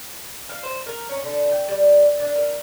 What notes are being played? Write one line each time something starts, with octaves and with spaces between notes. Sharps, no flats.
F5
C5
A#4
C#4
D3
G5
G3
D4
A#4